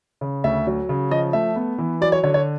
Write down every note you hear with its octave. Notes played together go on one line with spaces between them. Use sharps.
C#3
D2 E5
F#3
C#3
F3 D#5
A3 E5
B3
E3
F#3 D5
C#5
D3 C#5
C#5